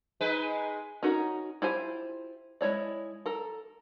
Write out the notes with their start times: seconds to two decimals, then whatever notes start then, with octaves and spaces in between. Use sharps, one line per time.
0.21 G#3 D#4 B4
1.03 C#4 D#4 F#4 A#4
1.62 E4 F4 G4 C5 G#5
2.61 G#3 E4 C#5 D5
3.26 A4 A#4